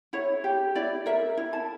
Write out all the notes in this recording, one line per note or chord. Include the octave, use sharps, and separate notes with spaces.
E4 C#5
G4
E4 D5
A#4 E5
E4
A5